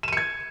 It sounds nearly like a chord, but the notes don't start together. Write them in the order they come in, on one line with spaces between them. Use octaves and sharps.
E7 D#7 C#7 G#6